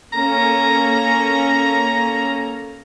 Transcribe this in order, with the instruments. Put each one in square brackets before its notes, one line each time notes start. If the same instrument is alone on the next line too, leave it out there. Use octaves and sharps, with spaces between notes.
[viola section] A#3 C#4 A4 [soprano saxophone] A#5